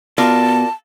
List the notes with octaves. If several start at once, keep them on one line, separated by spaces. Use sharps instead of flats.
B2 F4 A#4 D5 A5